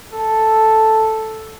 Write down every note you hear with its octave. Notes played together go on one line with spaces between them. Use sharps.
A4